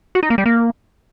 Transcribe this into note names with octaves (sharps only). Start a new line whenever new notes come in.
F#4
D#4
A#3
G3
A#3